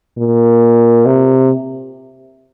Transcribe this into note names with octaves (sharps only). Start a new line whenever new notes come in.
A#2
C3